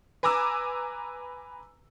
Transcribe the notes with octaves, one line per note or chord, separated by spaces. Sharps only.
B4 G#5 A#5 D6 E6